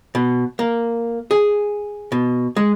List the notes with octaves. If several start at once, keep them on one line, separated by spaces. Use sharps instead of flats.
B2
A#3
G#4
B2
G#3